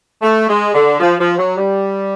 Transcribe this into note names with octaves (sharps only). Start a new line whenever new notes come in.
A3
G#3
D3
F3
F3
F#3
G3